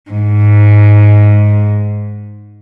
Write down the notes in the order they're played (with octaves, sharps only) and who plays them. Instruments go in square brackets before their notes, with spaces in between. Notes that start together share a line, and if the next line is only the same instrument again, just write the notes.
[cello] G#2